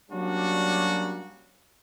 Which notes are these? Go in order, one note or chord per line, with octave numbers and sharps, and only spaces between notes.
F#3 G3 A#3 C#4 D4 F#4